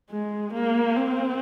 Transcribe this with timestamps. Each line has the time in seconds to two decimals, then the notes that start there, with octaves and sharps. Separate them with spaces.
0.10 G#3
0.54 A#3
0.96 C4